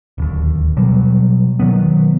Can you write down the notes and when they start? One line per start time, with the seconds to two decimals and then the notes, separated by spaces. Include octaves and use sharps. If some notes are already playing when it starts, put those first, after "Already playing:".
0.18 D1 D#2
0.77 B2 F#3 G3
1.59 B2 D#3 F#3 B3